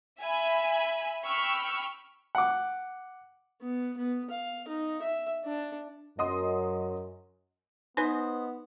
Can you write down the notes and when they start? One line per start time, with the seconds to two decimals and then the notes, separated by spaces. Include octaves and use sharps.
0.19 E5 G#5 B5
1.25 G5 B5 C#6 E6 F6
2.35 F#5 D6
3.62 B3
3.97 B3
4.30 F5
4.68 D#4
5.02 E5
5.45 D4
6.19 F#2 D#5 C6 D#6
7.97 B3 D#4 B4 C5 D#5 G#5